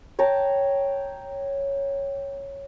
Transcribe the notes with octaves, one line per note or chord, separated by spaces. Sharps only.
C#5 G5 A5 A#5